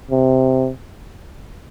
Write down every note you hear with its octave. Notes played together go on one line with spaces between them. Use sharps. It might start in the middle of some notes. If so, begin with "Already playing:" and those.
C3